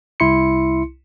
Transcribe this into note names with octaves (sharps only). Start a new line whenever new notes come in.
C2 E4 C6 C#7